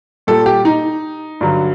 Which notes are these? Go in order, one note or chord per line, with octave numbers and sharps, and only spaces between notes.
A#2 G3 A4
G4
D#4
G2 D3 F#3